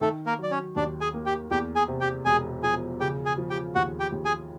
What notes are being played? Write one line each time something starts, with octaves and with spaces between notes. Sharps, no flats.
D#3 A3 A4
A#3 A#4
F#3 D5
C#4 C#5
D#2 D4 D5
G#4 G#5
A#3
G4 G5
E2 G4 G5
G#4 G#5
C3
G4 G5
E1 G#4 G#5
F3 G#4 G#5
C#3 G4 G5
G#4 G#5
F3
G4 G5
D#2 F#4 F#5
G4 G5
D#2
G#4 G#5